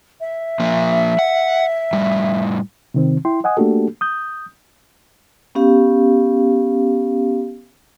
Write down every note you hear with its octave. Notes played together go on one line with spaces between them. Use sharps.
E5
F3 A#3
F#5
A2 G3
C3 D#3 C4
E4 G5 C6
D#5 F#5 G#5 D#6
A3 A#3 D4 F#4 G4 A4
D#6 G6
B3 C#4 G4 F5